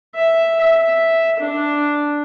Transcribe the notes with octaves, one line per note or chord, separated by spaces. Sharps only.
E5
E5
D4